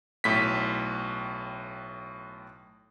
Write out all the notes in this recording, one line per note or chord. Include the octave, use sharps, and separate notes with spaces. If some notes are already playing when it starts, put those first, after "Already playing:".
B1 A2 B6